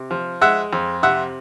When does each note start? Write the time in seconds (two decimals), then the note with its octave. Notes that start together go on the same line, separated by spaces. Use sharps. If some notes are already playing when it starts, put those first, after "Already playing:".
Already playing: C3
0.11 F3
0.41 G#3 E5 F#5
0.73 F2
1.03 C3 E5 F#5